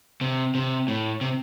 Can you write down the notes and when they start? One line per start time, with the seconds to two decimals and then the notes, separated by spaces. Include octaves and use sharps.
0.21 C3
0.55 C3
0.88 A2
1.21 C3